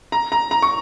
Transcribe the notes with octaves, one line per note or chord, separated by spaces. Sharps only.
A#5
A#5
A#5
C#6